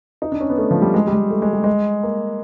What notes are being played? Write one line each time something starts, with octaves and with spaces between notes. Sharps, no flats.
D#4
D4
C#4
B3
A3
F3
G3
G#3
G3
G#3
A3
G#3
G3
G#3
A#3